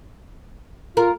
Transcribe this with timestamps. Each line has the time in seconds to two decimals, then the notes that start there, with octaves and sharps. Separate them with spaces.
0.97 F4 A#4